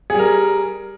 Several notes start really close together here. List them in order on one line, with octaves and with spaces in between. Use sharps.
G#4 G3 A#4